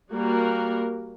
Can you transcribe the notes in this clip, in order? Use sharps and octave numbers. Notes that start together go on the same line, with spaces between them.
G3 A#3 F#4 A#4